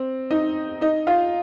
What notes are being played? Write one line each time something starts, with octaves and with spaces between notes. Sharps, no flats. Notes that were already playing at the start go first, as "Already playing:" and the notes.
Already playing: C4
D#4 D#5
D#4 D#5
F4 F5